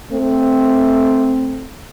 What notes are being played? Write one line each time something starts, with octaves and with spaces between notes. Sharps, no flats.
A3 C4